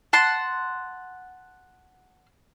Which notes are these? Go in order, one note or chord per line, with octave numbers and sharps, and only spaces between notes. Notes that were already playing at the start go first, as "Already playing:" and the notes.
F#5 A5 C6